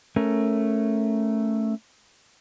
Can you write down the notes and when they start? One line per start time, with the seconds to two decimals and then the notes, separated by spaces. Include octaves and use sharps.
0.16 A3 C#4 A#4